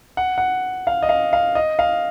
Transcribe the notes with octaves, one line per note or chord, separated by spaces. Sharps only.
F#5
F#5
F5
D#5
F5
F5
D#5
F5